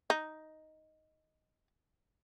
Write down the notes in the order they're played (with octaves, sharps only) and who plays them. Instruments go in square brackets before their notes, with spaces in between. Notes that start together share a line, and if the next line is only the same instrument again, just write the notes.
[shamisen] D#4